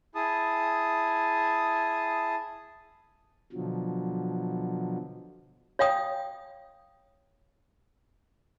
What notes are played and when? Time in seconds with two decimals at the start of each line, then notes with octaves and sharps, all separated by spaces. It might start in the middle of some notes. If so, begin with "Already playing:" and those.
0.15 E4 G#4 A5 D#6
3.53 B2 D3 F3 F#3
5.79 C#5 F5 G5 D#6